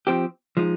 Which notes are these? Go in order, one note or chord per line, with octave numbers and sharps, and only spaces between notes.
F3 C4 G4
F3 G#3 D#4